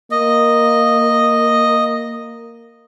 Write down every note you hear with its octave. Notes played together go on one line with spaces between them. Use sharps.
A#3 D#5